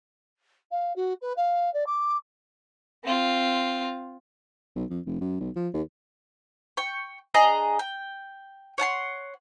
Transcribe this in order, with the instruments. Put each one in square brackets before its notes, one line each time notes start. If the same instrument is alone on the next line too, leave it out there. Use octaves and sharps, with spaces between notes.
[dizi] F5
F#4
B4
F5
D5
D6
[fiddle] C4 F4
[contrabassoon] B1
F2
F1
F#2
B1
F3
D#2
[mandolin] G5 C#6
D4 G#4 D#5 A#5
G5
C#5 F#5 A5 C6